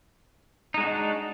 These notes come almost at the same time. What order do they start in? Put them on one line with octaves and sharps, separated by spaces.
D#4 G#3 F#4 D4